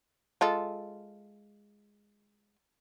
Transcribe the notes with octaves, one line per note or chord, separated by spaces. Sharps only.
G#3 F4 A4